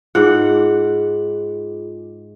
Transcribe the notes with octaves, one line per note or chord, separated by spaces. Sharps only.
G#2 F4 G#4 F#5